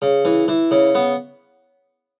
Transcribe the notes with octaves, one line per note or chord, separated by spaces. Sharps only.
C#3
E3
E3
C#3
B3